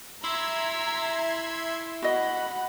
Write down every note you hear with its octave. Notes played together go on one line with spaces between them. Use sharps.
E4 E5 A#5 C6 G#6
F#4 D#5 F#5 B5